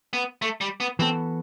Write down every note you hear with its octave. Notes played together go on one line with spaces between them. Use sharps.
B3
A3
G3
B3
E3 B3 C4 F#4 A4